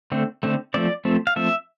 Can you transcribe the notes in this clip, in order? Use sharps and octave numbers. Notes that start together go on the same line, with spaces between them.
D3 A3 C4
D3 A3 C4
F3 A3 C4 D5
F3 A3 C4
F5
F3 A3 C4 E5